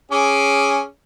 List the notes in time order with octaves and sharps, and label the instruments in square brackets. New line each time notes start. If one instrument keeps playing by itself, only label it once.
[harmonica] C#4 G#4 D6